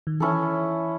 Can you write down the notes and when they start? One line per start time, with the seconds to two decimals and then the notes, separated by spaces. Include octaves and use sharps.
0.07 D#3
0.20 E3 C#4 E4 A4